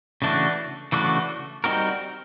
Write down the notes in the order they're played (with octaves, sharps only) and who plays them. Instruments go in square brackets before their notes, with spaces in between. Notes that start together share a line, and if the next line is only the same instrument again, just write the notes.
[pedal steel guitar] C#3 E3 A3 D4 F#4
C#3 E3 A3 D4 F#4
G3 C4 D#4 F#4 A#4